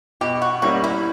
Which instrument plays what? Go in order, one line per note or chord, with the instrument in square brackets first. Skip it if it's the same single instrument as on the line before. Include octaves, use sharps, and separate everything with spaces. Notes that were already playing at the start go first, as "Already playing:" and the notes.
[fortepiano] B2 [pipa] G4
[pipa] F#4
[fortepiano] G3 A#3 C#4 E4 [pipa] F#4
[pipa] E4